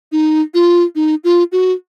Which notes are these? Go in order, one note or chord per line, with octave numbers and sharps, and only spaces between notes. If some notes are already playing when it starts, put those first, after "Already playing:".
D#4
F4
D#4
F4
F#4